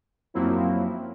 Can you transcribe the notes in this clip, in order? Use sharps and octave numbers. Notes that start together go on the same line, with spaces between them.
F#2 F3 F#3 A#3 C4 E4